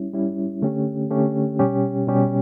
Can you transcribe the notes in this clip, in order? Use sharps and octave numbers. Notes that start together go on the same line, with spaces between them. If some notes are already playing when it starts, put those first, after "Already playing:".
Already playing: G3 C#4 E4
G3 C#4 E4
D3 A3 C#4 G4
D3 A3 C#4 G4
B2 G3 C#4 G4
B2 G3 C#4 G4